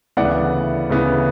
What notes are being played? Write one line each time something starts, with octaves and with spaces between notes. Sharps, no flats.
D2 C#3 E3 B3 D5 F#5
D2 C#3 E3 B3